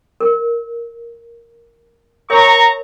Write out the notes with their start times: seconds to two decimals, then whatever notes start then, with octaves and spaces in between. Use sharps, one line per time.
0.20 A#4
2.30 A#4 C#5 E5 A#5 C#6